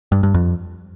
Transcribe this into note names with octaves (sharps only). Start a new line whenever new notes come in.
G2
G2
F2